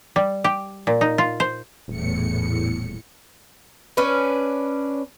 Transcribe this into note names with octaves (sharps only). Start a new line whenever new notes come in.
G3
G4
A#2
D#4
F4
C5
D#1 E2 A2 C#7
C#4 D4 B4